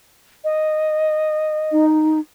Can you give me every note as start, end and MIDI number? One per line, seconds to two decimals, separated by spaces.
0.44 1.85 75
1.72 2.20 63